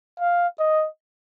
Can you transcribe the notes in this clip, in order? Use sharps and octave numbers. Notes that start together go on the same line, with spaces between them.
F5
D#5